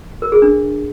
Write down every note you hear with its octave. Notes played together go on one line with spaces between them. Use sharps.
A#4
G#4
D4